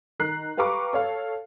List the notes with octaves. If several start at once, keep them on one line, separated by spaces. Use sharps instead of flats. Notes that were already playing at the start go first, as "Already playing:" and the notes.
D#3 A#5 F#6 C7
G4 B4 F5 A#5 C#6 D6
A4 C#5 F5